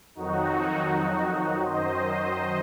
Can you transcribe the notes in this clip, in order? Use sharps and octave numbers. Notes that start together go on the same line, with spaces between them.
F2 D#3 F#3 D#4 F#4
F#2 D#3 F#3 C5 D#5
C5 D#5